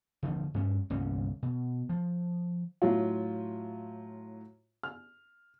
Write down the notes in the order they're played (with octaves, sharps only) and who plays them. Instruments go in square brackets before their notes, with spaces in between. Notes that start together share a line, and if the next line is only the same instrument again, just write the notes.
[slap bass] D#1 D3 D#3 F3
G2 C#4
G1 C2 A#3 C#4
B2
F3
[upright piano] A2 F#3 F4
F6